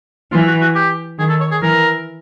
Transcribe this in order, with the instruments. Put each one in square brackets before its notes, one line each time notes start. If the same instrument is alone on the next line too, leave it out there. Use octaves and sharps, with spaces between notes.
[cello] E3 [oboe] F4
[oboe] F#4
F#4
G4
[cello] D#3 [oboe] G#4
[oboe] A4
C#5
G#4
[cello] E3 [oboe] A#4